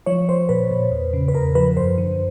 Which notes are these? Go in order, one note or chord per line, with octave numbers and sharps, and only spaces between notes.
F3 C#5
F3 C5
A#2 B4
A#2
E2
C#3
B4
E2 A#4
F3 B4
F#2 C5
D3